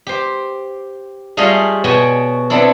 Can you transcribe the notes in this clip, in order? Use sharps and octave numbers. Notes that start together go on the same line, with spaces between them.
G4 C5
G3 A3 F4 G#4 D#5 F5
B2 F#4 C#5 G5 G#5
B3 C4 D4 E4 A4